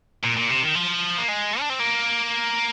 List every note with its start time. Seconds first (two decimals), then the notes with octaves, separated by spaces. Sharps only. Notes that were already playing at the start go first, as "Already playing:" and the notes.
0.23 A#2
0.37 A#2
0.50 C3
0.63 D#3
0.76 F3
1.18 A#3
1.28 G#3
1.60 D4
1.69 C4
1.79 A#3